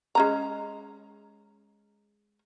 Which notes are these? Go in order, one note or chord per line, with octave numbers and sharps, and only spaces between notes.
G#3 C#4 A#5